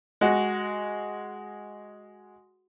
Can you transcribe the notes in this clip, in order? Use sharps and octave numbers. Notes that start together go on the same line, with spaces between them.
G#3 F#4